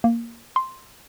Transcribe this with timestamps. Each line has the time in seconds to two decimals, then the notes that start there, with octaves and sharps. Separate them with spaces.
0.04 A#3
0.56 C6